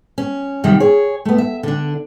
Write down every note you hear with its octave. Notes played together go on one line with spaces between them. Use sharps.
C#4
F#2 C3 D#3 G3 A#3 F4
G#4 C#5
A3 B3
E5
D3 D4